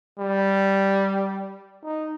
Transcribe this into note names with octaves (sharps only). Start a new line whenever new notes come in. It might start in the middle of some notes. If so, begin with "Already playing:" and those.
G3
D#4